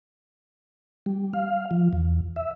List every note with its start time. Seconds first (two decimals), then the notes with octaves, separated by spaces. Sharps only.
1.06 G3
1.33 F5
1.71 F3
1.93 E2
2.36 E5